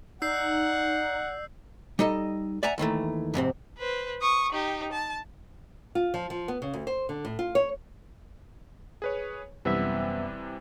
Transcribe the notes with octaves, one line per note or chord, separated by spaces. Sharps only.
D#4 D5 F#5 E6 G6 C7
G3 D#4 A4 D#5
D5 E5 F#5 G#5 A#5
D#2 D#3 E3 A3
F2 G#2 C3 C4
B4 C5
C#6 D#6
D#4 G4
A5
F4
F3
F3
B3
C#3
D2
C5
D3
A2
F4
C#5
G#4 B4 C#5
F#2 C3 E3 G3 B3 E5